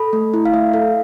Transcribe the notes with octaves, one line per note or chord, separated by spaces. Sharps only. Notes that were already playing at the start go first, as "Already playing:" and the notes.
Already playing: A4 B5
A3
E4
F5
A3 E5
A4 F5